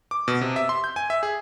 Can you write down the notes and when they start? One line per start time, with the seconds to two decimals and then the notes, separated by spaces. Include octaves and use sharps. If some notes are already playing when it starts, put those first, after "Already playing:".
0.11 D6
0.28 B2
0.41 C3
0.56 E5
0.69 C6
0.84 G6
0.96 G#5
1.10 E5
1.23 G#4